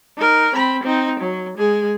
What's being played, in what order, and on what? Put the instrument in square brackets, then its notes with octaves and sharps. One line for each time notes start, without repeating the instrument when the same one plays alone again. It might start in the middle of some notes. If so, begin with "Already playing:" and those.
[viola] D#4 A#4
C4 B5
C4 D#4
F#3
G#3 G#4